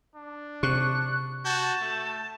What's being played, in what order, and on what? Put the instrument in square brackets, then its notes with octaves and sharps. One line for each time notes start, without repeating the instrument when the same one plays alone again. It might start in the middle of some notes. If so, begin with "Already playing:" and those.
[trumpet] D4
[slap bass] C3 [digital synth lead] C#6 [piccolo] F#6
[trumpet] F#4 [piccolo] A5 [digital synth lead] G6
[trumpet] A3